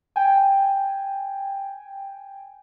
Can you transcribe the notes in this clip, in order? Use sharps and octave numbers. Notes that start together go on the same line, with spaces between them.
G5 G#5